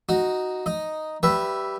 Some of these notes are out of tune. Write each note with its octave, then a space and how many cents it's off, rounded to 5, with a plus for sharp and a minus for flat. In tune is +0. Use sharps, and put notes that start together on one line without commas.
D#4 +0 F#4 +0
D#4 +0 D#5 +0
G3 -10 B4 +0 E5 +0